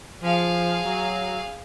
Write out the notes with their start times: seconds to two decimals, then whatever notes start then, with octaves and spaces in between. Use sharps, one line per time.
0.22 F3 G#4 F5
0.85 F#3